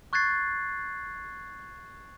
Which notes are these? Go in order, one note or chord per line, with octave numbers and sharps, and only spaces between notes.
C#6 F#6 G#6 A6 C7